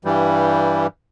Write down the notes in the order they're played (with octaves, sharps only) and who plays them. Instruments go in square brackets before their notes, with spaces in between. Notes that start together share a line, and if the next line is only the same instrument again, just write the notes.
[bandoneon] G2 E3 G3